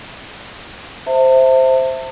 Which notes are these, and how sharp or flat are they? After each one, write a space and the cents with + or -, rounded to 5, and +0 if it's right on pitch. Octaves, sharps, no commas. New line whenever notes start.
C5 +0 E5 +0 A5 +40